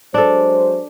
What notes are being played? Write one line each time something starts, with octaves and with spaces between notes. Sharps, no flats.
F#3 G#3 D4 A4 C5